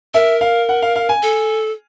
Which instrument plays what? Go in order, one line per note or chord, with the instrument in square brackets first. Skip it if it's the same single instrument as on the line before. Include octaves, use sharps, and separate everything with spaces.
[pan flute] A#4 [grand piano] E5
[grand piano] F5
F#5
F5
F5
G#5
[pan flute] A4